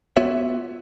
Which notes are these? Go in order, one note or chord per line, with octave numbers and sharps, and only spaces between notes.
B3 F4 F#4 C#5 E5